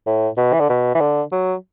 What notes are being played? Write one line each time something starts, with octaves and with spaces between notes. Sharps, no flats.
A2
B2
E3
D3
B2
E3
D3
F#3